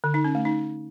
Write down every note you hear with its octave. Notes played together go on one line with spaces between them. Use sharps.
D3
D#4
C#4
A3
D#4